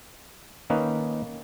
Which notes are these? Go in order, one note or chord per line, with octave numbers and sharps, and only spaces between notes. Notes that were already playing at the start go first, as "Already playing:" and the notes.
D#3 A#3 C#4 D#4 B4